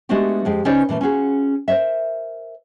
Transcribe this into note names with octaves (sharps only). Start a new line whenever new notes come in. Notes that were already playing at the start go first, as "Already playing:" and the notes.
G#3 A3 B3 D4 F#4 G4
F2 G#3 G4
C#3 C#4 D#4 B4 C5 D5
A#2 E3 A3 C#4
C#4 F4 F#4 G#4
A#4 C5 C#5 D#5 E5